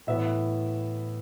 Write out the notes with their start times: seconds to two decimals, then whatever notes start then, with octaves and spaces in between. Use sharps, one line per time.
0.07 A2 E3 B3 E5